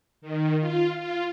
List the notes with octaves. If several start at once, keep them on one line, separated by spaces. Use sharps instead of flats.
D#3
F4
F4